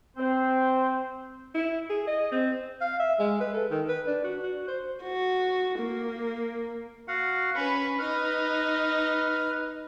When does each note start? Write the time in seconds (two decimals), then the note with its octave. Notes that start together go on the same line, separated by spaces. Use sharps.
0.17 C4 C5
1.54 E4
1.90 G#4
2.07 D#5
2.32 C4
2.81 F5
3.00 E5
3.19 G#3
3.41 B4
3.54 A4
3.71 D#3
3.88 B4
4.07 D4
4.24 F#4
4.43 F#4
4.68 C5
5.04 F#4
5.80 A#3
7.08 F#4 F5 F#5
7.55 C#4 B4 B5 C#6
7.99 D#4 B4 F6